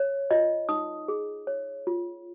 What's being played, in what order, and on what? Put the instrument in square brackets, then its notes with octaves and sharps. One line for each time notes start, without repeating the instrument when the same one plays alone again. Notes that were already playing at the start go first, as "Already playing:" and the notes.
Already playing: [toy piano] C#5
F4 D#5
D#4 D#6
G#4
C#5
F4